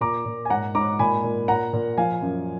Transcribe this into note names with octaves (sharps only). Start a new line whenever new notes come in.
A#2 A#5 D6
A#2
G#5
G#2 F#5 A#5
G#2 A#5 D6
A#2 G#5 B5
A#2
A#2 F#5 A#5
A#2
F3 F5 G#5
F#2